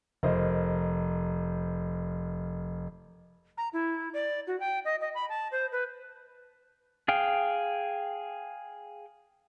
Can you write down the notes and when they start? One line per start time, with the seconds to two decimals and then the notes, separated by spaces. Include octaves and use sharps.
0.23 F1 A#4 C5 D#5
3.58 A#5
3.73 E4
4.14 D5
4.47 F#4
4.60 G5
4.85 D#5
5.01 D#5
5.15 B5
5.29 A5
5.52 C5
5.72 B4
7.08 G#4 F5 G5